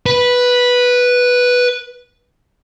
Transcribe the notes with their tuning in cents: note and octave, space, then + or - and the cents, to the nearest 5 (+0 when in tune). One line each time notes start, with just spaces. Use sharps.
B4 -5